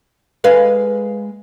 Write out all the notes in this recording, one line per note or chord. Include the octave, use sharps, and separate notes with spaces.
G#3 B4 F5